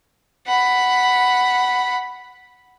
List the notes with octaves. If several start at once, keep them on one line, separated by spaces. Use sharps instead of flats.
F#5 B5